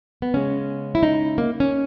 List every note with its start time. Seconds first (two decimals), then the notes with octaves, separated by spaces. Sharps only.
0.22 B3
0.34 C#3 G#3 C#4
0.95 E4
1.03 D#4
1.38 A#3
1.60 C#4